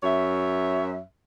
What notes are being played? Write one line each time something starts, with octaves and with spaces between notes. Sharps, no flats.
F#2 C#5 E5